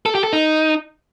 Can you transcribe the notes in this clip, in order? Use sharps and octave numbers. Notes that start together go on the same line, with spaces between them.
A4
G4
A4
D#4